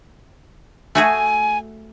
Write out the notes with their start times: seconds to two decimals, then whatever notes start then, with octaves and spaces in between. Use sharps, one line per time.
0.95 A3 F#4 G#4 G#5